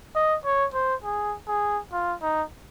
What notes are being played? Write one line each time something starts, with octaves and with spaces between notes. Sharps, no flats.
D#5
C#5
C5
G#4
G#4
F4
D#4